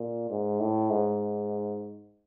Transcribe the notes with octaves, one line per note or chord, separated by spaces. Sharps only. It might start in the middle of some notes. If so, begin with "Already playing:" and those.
Already playing: A#2
G#2
A2
G#2